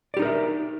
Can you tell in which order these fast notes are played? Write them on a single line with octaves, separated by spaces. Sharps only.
D5 G4 D#4 A#4 E5